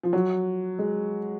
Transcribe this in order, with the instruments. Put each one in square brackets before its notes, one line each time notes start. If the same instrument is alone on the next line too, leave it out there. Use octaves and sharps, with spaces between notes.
[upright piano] F3
F#3
G#3